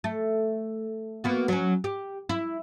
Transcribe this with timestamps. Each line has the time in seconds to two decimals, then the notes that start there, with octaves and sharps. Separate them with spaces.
0.04 A3
1.24 A#3 B3 F#4
1.48 F#3 C#4
1.84 G4
2.29 E4